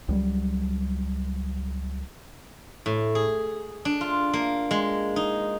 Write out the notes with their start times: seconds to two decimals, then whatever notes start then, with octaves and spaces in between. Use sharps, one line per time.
0.09 C#2 F#3 G3
2.86 A2
3.15 G#4
3.85 D4
4.01 F4
4.33 A#3
4.71 G#3
5.16 D#4